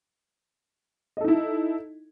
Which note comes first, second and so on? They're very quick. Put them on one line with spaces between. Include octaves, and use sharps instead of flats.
D#5 A4 D#4 E4